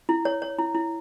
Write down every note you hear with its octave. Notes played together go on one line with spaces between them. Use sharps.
E4
C#5
C#5
E4
E4